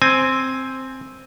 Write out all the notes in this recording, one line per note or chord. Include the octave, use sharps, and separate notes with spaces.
C4 G#5